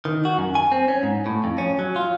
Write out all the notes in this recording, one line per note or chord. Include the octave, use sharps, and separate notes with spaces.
D#3
F#4
F#2
G#5
C4
C#4
G#2
A2
F2
C#4
F#3
F4